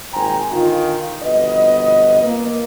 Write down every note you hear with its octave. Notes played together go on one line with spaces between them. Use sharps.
G#1 A#2 C5 G5 G#5 A#5
D3 D#3 D#4 F4
G1 F2 B2 B4 D#5
A#3